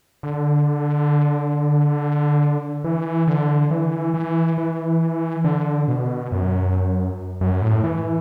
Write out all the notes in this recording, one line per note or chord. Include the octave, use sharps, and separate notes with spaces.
D3
E3
D3
E3
E3
E3
D3
B2
F#2
F#2
A2
E3